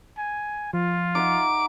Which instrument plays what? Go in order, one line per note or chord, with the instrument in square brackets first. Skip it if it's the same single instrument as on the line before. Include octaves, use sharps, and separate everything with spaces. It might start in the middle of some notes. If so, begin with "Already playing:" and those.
[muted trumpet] G#5
[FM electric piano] F3 [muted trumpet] F4
[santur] D#4 E5 F#5 [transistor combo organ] D6